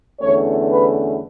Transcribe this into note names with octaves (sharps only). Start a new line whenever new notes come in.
E2 D3 A3 C#4 C#5
B4